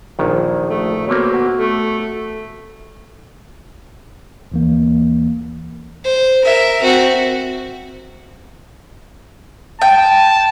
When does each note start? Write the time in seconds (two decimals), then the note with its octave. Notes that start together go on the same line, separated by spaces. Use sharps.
0.19 A#1 D#3
0.69 A3
1.07 B2 A#3 C4 C#5
1.34 F#4
1.57 A3
4.52 D#2 E3 A#3
6.04 C5
6.44 A#4 E5
6.82 C4 F#4
9.82 G5 A5